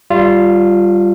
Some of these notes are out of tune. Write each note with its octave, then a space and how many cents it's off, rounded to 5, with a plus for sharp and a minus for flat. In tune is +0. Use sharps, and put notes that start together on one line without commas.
G3 +0 F4 +0 F5 -45